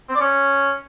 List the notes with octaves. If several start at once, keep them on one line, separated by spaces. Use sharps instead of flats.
C4
D5
C#4